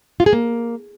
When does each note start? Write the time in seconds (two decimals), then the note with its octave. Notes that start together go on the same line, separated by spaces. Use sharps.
0.20 F4
0.26 G#4
0.33 A#3